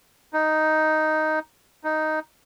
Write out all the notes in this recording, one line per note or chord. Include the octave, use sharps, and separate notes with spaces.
D#4
D#4